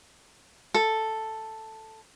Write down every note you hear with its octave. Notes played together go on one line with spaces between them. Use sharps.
A4